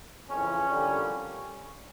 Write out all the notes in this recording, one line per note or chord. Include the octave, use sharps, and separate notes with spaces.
F2 C#3 E3 C#4
F2 D3 G3 A#3